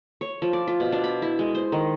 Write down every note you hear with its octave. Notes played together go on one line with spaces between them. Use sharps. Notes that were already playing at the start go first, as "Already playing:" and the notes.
C#5
F3
D5
F4
B2
D4
B5
E4
G#3
C5
D#3